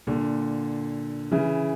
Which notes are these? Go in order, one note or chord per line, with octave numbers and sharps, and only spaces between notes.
A#2 D3
C#3 E3